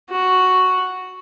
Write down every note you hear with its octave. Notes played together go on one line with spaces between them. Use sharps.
F#4